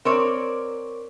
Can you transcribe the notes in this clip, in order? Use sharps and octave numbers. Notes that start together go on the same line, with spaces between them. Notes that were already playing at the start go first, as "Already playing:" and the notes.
C4 A#4 C#5 D5